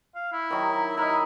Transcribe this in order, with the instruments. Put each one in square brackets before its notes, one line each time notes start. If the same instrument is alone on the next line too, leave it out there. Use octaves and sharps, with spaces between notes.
[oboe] F5
E4
[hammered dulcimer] D#3 F#3
[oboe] E4 [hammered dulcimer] A#4 D#5